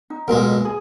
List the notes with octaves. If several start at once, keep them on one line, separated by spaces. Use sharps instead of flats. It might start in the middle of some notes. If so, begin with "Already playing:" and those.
D#4
B1 A#2 G#3 A#4
G#4